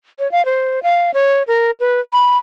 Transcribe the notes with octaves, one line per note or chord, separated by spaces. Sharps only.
C#5
F5
C5
F5
C#5
A#4
B4
B5